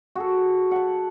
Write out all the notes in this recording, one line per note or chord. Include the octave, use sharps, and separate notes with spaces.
F#4 G#4 A4
F#5 A5